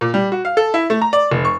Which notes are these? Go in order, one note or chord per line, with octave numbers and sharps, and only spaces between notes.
A#2
G3
F#4
F5
A4
E4
A3
A#5
D5
F1
C#6